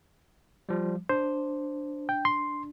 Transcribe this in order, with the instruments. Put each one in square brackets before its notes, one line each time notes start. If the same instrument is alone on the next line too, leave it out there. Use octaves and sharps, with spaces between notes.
[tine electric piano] F3 G3
[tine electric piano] D4 [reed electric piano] C5
[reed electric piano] G5
C6